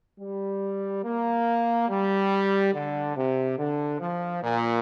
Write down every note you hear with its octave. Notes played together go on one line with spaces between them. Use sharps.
G3
A#3
G3
D3
C3
D3
F3
A#2